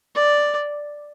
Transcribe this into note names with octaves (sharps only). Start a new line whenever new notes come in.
D5